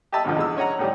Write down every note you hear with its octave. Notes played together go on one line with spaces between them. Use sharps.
G4 D#5 E5 A5 B5 E6
D#2 G#2 B2 D3 F3
E2 G#3 E6
C#4 C#5 D#5 F#5 A#5
A2 D#3 G3 C#4 G4